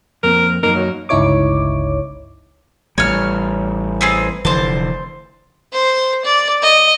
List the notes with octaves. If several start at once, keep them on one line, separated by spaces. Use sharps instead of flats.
F2 A#3 C4 A#4
F#2 A#3 D#4 A#4
F#3
G1 C#2 D#4 E4 C#5 D6
A1 G3 C#5 F6
B3 C4 G#4
F1 D3 E3 C5 A5
C5
D5
D#5